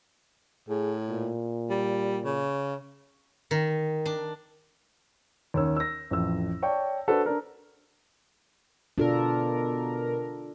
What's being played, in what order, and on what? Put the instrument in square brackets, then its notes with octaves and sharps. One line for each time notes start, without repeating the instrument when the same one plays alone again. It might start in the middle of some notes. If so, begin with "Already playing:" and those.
[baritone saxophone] A2 [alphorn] G#4
[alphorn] A#2
[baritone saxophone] G3
C#3
[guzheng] D#3
D4
[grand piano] D#2 C#4 E6
E6 A#6
A1 F2 E6
C#5 D5 G5 A5 C#6
D4 F#4 A4 B4 C5
D4 A#4
[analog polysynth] B2 A#4 [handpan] D4 F4 A4